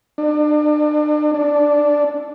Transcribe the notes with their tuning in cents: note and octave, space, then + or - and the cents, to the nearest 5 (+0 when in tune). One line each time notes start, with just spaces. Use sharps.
D4 +35
D4 -5